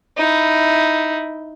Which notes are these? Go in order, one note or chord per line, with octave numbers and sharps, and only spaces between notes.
D#4 E4